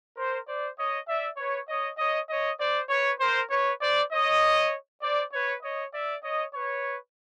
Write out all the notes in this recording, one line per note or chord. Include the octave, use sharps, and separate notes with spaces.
A#4 C5
C5 D5
C#5 D#5
D5 E5
B4 C#5
C#5 D#5
C#5 D#5
C#5 D#5
C5 D5
B4 C#5
A#4 C5
B4 C#5
C5 D5
C#5 D#5
C5 D5
B4 C#5
C#5 D#5
D5 E5
C#5 D#5
B4 C#5